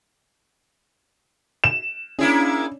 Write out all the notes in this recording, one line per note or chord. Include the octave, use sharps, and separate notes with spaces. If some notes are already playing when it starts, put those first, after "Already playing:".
E7
A#3 C#4 D4 E4 G#4